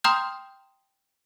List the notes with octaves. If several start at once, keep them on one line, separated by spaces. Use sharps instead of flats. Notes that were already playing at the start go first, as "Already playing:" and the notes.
G5 A#5 C6 D#6 F6 G6